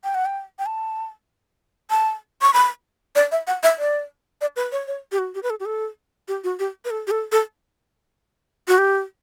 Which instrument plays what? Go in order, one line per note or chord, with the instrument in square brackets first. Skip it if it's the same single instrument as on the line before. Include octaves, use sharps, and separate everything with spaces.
[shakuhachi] G5
F#5
G5
G5
A5
A5
C#6
B5
D5
E5
F#5
E5
D5
D5
B4
C#5
C#5
G4
F#4
G4
B4
A4
G4
A4
G4
F#4
G4
B4
A4
G4
A4
A4
F#4
G4